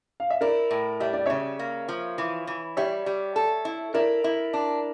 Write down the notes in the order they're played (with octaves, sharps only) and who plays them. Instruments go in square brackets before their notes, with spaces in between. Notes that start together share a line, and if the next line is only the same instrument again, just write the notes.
[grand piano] F5
E5
[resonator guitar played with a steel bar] E4 [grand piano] A#4 D5
[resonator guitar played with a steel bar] A2
[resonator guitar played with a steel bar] G3 [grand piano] E5
[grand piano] D5
[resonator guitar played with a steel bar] C#3 [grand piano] C#5 E5
[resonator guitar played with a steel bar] A#3
F3
E3
E3
[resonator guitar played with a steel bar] G3 [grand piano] C#5 E5
[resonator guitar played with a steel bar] G3
A4
E4
[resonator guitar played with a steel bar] E4 [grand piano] A#4 D5
[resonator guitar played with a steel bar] E4
D4